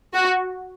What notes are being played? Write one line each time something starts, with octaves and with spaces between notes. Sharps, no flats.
F#4